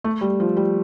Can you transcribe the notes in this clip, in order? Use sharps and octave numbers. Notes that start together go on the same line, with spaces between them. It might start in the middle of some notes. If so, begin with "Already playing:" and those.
A3
G3
F3
G3